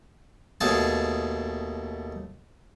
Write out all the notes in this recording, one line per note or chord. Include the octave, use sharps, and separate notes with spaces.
D#2 B2 A3 G#4 G#5 A5